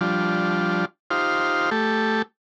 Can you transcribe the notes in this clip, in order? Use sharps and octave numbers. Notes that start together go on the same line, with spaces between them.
F3 G3 D4 F4
D#4 F4 G4 C5 F5
A3 G4 A4